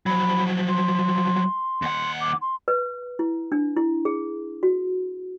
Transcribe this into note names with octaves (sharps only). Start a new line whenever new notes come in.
F3 F#3 B5
C6
D#2 F#5
D6
C6
B4
E4
D4
E4
G#4
F#4